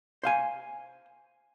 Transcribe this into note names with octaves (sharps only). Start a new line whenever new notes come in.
C5 F5 G#5